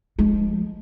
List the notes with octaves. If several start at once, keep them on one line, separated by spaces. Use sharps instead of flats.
F3 G#3